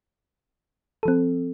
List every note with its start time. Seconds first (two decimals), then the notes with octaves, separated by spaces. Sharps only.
1.03 A4
1.05 F3
1.08 C4